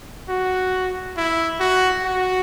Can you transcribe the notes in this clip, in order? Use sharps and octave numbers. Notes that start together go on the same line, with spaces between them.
F#4
E4
F#4
F#4